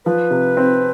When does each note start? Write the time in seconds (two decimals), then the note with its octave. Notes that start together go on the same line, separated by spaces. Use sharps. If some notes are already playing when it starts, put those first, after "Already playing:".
0.05 F3 B4
0.30 C3
0.57 C4